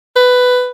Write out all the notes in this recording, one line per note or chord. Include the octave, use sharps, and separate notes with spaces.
B4